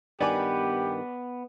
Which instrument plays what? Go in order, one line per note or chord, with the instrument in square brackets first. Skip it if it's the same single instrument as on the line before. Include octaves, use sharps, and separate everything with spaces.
[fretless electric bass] G2 D#3 [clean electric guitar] B3 B4 [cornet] G4 [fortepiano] D5 G#5 D6